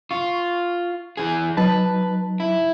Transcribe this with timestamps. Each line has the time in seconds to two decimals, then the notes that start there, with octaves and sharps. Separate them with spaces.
0.11 F4 C#6
1.17 E3 G#4
1.57 F#3 D#4 B4 A5
2.40 E4